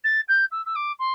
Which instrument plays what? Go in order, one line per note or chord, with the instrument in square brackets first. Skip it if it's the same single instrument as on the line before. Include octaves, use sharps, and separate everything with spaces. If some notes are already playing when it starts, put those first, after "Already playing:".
[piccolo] A6
G6
E6
E6
D6
C6